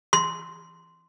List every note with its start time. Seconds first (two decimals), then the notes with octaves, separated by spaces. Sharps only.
0.13 C6